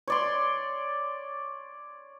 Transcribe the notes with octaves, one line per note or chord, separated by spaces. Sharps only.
C#5 D5 C6